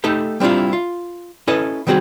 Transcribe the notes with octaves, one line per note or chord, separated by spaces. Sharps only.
A3 D#4 G4 A4 G5
G3 C4 D4 E4 F4
F4
C#4 E4 A4 B4 D#5
D#3 G3 C4 F#4 G#4